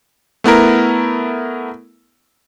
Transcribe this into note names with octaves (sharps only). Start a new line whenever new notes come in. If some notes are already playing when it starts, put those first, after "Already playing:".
A3 B3 E4 A#4